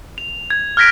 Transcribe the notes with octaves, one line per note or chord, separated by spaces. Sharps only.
F7
G#6
F6 F#6 G#6 A#6 B6 D7